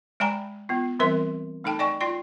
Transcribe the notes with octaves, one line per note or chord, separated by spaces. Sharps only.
G#3 D5 G5 G#5 A#5 B5
B3 F4
E3 G3 C4 A#4 E5 C6
A3 D#4 A4 G5 A5
D5 D#5 G5 G#5 C#6
F4 D5 G5 C6